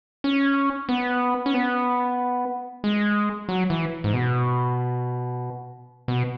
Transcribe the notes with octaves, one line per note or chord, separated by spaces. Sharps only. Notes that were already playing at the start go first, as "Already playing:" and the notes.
C#4
B3
C#4
B3
G#3
F#3
E3
G#2
B2
B2